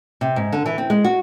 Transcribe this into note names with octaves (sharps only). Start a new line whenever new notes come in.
C3
G#2
D3
E3
C4
G#3
F#4